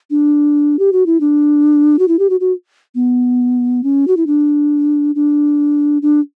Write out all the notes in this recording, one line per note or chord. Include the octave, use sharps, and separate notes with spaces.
D4
G4
F#4
E4
D4
F#4
E4
G4
F#4
F#4
B3
C#4
F#4
E4
D4
D4
D4